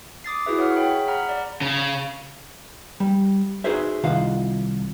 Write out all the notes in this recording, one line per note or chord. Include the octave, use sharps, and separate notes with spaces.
D6 D#6 A6 C7
E4 F#4 G#4 B4 E5
C#5 F#5 F6
G#4 C#5 E5 G5 B5
F#5 A#5 B5 F6
D5
C#3
G3
D#4 F#4 G#4 B4 C5 E5
C2 D#3 F4 F5 F#5